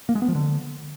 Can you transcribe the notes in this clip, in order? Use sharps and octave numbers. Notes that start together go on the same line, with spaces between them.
A#3
G#3
B3
F3
D3